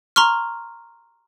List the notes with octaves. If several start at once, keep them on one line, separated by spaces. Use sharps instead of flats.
A#5 C6 C#6 F6